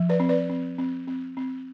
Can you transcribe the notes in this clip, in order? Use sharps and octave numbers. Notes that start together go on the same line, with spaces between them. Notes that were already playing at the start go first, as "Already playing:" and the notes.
Already playing: F3
B4 D5
C4
B4 D5
C4
C4
C4
C4